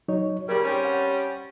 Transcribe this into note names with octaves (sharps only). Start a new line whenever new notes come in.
F#3 D#4 C#5
A#2 C#3 G3 A#4
G3 C4 C#4
F#5